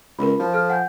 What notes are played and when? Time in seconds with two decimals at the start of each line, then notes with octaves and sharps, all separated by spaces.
0.19 C#2 A#4 B5
0.40 F3
0.54 A4 F6
0.70 F#5 G#5 G6